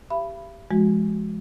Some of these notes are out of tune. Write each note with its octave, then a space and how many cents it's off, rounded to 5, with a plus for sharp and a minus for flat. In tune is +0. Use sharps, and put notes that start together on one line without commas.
G4 +0 E5 +45 B5 +0
F3 -40 G#3 +0 F#4 +0